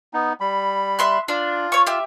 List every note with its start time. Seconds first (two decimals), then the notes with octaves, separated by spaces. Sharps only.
0.14 B3 D#4
0.41 G3 B5
0.99 E5 C6 F#6
1.28 D4 F4
1.72 C#5 C#6
1.87 G4 E5